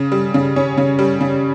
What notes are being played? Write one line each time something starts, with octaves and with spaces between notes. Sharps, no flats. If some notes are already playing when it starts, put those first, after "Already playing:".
Already playing: C#3
G3
C#3
C#4
C#3
G3
C#3